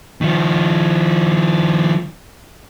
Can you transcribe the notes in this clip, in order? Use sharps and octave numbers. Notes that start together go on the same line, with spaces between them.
D#3 F3